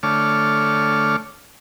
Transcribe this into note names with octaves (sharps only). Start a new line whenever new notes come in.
D3 A3 C#5 D6 F6